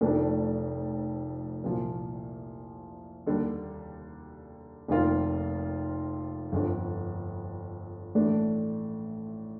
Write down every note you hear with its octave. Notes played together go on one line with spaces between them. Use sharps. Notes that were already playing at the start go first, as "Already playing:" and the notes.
F1 F2 D#3 A3 D4
C2 A#2 F3
D#2 D3 G3
F1 F2 D#3 A#3 F4
G1 F2 D3
A1 A2 A3 D4